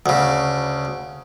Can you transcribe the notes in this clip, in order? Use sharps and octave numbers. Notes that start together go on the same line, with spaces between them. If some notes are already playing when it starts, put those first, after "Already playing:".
D2 C#3